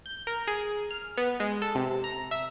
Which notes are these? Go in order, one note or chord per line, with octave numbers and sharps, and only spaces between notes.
G6
A#4
G#4
F6
B3
G#3
A4
C3
A#5
E5